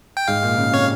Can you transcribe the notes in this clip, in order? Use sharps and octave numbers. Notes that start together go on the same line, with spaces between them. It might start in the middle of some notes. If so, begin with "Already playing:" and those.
G5
G#2 F5
A#2
C#3
C3 C#5